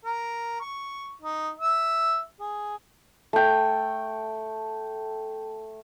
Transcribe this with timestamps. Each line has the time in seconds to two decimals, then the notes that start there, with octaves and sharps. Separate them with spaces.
0.05 A#4
0.61 C#6
1.22 D#4
1.59 E5
2.40 G#4
3.33 A3 G5